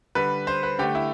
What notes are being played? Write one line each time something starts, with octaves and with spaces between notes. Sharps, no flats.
D3 G3 B4
C5
B4
D3 A3 G4
E4